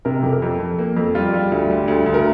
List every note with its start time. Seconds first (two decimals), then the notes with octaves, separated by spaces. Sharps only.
0.05 C3 A#4
0.23 F2 G4
0.33 A#4
0.42 F2
0.59 F2
0.79 A#3
0.97 F2
1.15 G3 F4
1.34 G3
1.52 D2
1.70 G3
1.88 D2
2.06 D2
2.14 A#4